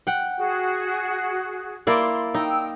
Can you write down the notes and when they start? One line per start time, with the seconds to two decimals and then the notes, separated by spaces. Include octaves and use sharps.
0.07 F#5 G5
0.37 F#4 G#4
1.87 A#3 E4 D5 C6
2.34 D#4 G5 E6